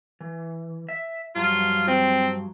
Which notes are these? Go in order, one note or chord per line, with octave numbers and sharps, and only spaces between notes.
E3
E5
G2 F3 F#3 F4
C4